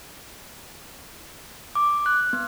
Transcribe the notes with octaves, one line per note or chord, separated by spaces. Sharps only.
D6
F#6
B3